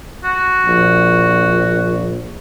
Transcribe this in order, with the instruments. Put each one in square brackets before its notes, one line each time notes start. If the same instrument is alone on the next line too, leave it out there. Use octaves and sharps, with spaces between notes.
[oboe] F#4
[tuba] A#1